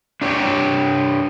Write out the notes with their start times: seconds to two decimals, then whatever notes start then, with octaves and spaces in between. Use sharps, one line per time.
0.21 D4 G4 C#5